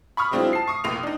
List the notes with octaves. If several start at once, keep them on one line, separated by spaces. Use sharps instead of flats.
B5 C#6 D#6 F6
F#3 G#3 C4 D4 E4 F4
A5 C7
C#6 D#6 C7
F1 A#1 A#3 F7
D4 D#4